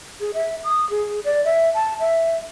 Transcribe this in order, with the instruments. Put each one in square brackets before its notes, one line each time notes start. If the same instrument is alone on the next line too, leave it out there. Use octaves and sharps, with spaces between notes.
[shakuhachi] G#4
E5
D#6
G#4
D5
E5
A5
E5